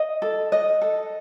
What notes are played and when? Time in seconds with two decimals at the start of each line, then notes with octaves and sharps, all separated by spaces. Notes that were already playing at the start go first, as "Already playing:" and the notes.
Already playing: D#5
0.22 A4
0.52 D#5
0.81 A4